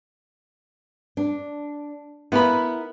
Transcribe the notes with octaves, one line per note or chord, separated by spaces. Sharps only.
D4
B3 E4 A#4 B5